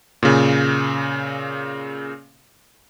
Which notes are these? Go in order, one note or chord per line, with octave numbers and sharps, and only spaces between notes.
A#2 C#3